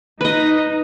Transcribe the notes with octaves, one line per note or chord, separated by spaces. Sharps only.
D#4 B4 D#5